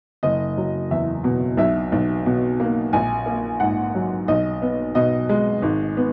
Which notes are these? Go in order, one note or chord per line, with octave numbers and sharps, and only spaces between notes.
F#1 D#5
F#3
E2 E5
B2
B1 E5
B1
B2
A#3
A#1 G#5
A#3
G#2 F#5
F#3
B1 D#5
B3
B2 D#5
G#3
G#1
B3